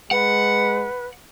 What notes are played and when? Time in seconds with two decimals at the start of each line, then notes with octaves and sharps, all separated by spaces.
0.11 G#3 B4 F#5